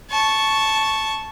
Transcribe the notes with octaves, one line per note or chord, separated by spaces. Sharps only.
A5 C#6